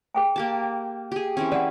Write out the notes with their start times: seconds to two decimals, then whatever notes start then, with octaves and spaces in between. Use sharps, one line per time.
0.15 G#4 G5 G#5
0.36 A#3 G4 A5
1.12 G4 G#4
1.37 E3 C4 C#4
1.52 E3 B4 D5 F#5